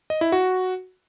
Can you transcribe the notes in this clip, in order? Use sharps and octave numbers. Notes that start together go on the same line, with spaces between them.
D#5
E4
F#4